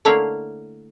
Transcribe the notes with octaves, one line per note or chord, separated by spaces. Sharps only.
D3 A3 A#3 E4 C#5 F5